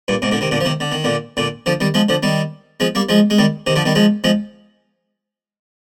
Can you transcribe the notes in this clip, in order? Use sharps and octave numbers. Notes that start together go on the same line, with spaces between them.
G2 A#2
G#2 C3
A#2 D3
C3 D#3
A#2 D3
F3
C3 D#3
D3
D#3
A#2 D3
A#2 D3
D3 F3
D#3 G3
F3 G#3
D3 F3
D#3 G3
F3 G#3
G3 A#3
F3 G#3
G#3
D#3 G3
C3 D#3
D3 F3
D#3 G3
F3 G#3
F3 G#3